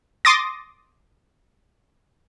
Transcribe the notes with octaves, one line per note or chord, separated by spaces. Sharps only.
C6 D6 D#6 A6 A#6